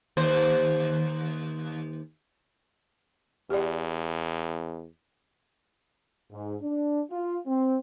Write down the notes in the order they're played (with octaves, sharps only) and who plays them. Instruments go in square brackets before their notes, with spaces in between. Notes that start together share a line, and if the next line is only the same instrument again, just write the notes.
[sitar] D#2 C5
[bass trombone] E2 [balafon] G4 D5
[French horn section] G#2
D4
F4
C4